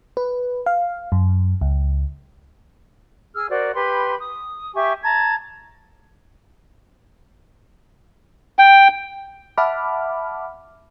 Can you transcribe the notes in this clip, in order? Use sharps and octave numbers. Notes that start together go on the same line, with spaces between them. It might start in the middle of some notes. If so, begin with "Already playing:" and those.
B4
F5
F#2
C#2
G#4 E6 F6
F#4 A#4 C5 D5
G4 B4 B5 C6
D#6
G4 E5 G#5 C#6
A5 A#5 G#6
G5
E5 F#5 A5 B5 D6 F6